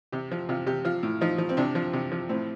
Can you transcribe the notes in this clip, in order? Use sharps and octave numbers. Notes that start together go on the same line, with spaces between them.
C3 G4
F3
C3 F4
C3 G4
F3 F4
A2
F3 D#4
F3
C4
C3 D4
F3
C3
F3
A2 C4